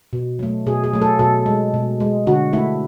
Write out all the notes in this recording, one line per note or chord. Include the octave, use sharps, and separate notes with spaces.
B2
F#3 A3
B2 G#4
G#4
F#3 A3
A4
B2 A4
G#3
B2
G#3
D3 F#4
A3 E4